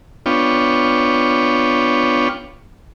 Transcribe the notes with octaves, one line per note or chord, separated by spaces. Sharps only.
B3 D4 F4 C#5 G5